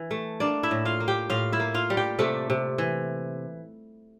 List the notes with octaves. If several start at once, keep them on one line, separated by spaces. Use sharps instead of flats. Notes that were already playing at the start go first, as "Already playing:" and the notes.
Already playing: E3
A3
A#3 D4 D5
E4 E5
A2
F4 F5
A#3
G4 G5
A2 F4 F5
E4 E5
A#3
F4 F5
G3
G4 G5
C3 A3 A4
C3
E3